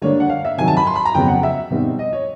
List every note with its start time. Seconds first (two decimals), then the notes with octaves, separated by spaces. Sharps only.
0.02 D3 G3 A#3 D4 C#5
0.20 F#5
0.30 F5
0.45 E5
0.58 C3 D#3 F#3 G#5
0.68 A5
0.77 B5
0.87 C6
0.95 B5
1.05 A#5
1.14 F2 C#3 F#3 B3 G5
1.28 F#5
1.43 E5
1.70 B2 G3 C4 D#4
1.99 D#5
2.13 C#5